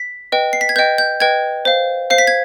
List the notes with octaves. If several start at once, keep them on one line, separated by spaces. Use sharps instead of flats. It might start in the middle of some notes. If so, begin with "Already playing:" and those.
Already playing: B6
B4 D#5 G5
C7
B6
G#6
B4 D#5 G5 G6
G6
B4 D#5 G5 G#6
C5 F5
C5 F5 C7
B6
G#6